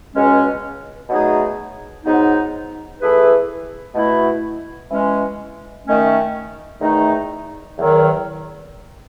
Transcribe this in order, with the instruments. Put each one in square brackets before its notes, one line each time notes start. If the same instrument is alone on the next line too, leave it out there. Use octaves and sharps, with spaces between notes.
[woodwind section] C#2 B2 G#3 C#4
B2 F#3 A3 D#4 G#4
G#2 F#3 B3 D#4
E3 A3 E4 G#4 B4
B2 A3 E4
E3 G#3 C#4
D#3 A3 C#4
E2 D#3 A3 D#4
E2 D#3 F#3